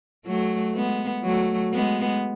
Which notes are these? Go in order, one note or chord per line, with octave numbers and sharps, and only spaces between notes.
F#3 A3
G#3 B3
F#3 A3
G#3 B3